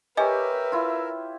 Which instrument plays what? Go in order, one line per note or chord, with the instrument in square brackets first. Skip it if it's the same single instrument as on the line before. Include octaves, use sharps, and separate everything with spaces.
[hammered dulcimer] G4 C#5 [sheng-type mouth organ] A#4 E5 [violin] B4 [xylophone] D#5 G#5
[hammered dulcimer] E4 F4